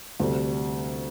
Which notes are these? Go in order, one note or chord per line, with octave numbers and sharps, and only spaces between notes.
D2 C3 G3 D4